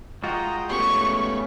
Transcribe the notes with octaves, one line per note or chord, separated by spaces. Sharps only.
G#3 F4 F#4 D#5 G5 A#5
A3 B3 C#4 G4 B5 C#6